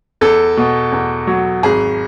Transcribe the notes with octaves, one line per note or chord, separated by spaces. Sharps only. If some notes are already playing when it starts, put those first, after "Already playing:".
E2 A4
B2
E2
F#3
G#1 G#4